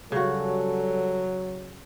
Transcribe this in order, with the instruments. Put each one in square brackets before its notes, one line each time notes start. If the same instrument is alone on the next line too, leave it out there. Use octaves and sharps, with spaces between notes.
[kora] C#3 F#4 [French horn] F#3 [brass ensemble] G3 C#4 A4